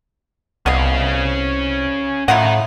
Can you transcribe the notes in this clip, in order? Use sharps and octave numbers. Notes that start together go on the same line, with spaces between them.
C2 B3 C#4 D#5 F5
A2 E4 F4 A#4 D#5 F#5